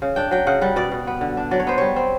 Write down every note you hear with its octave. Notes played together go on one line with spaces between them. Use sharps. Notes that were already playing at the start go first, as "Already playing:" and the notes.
C#3
D4 G5
F#3 G5
C#3 F#5
G3 F#5
B2 D5
B2
B3
D3
D4
F#3 D5
C#5
B3 C5
G3 C#5
C4